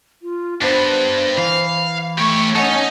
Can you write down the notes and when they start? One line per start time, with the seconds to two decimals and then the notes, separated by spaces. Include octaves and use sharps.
0.22 F4
0.62 G2 B3 D4 C5
1.38 E3 F5
2.18 A3 G4 C#5 C#6
2.55 C#4 D#4 A4 C#5 D#5 F#5